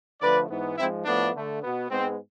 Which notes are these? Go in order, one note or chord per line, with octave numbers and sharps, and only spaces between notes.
D3 F3 A3 B4 D5
G#2 E3 B3
G#2 F3 G#3 C4 E4
A2 F3 A3 B3 D4
D3 A3
B2 B3
G#2 G#3 B3 C4